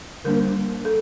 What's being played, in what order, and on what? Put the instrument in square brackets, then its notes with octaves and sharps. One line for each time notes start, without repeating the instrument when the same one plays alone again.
[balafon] D3 G3 A#3 D4 A#4
A4